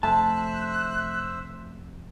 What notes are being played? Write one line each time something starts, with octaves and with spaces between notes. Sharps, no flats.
F1 A3 C5 E5 A5 E6 F#6